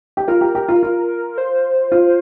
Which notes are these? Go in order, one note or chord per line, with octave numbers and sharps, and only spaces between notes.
G4
F4 A#4
G4
G4
F4
F4
C5
F4